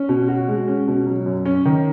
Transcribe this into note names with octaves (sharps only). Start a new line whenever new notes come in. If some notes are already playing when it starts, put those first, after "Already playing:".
Already playing: C#4
B2
F#4
G#3
C#4
B2
F#3
F#2
C#4
D#3